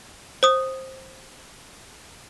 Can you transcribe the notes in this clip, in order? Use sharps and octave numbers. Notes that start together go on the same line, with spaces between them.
C5 D#6